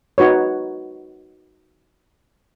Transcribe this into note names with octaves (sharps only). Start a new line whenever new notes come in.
D#4 F#4 B4 C#5